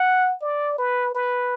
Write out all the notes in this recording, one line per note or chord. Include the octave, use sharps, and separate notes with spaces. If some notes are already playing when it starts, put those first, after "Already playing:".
Already playing: F#5
D5
B4
B4